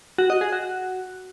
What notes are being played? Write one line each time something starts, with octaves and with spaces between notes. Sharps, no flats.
F#4
D#5
G#4
F#4